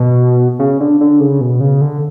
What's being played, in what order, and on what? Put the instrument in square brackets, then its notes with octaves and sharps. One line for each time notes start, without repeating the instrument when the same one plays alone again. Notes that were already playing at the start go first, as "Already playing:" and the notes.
Already playing: [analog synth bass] B2
C#3
D3
D3
C#3
B2
C#3
D3